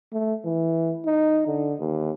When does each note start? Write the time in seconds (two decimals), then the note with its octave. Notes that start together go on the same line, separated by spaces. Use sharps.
0.13 A3
0.45 E3
1.06 D#4
1.47 D3
1.80 D#2